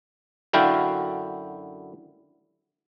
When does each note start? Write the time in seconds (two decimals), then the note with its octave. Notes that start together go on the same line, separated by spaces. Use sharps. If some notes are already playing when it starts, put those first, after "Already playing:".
0.53 F#2 D3 E4 F#4 F5 G5